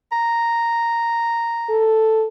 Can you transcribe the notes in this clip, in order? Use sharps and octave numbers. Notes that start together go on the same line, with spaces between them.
A#5
A4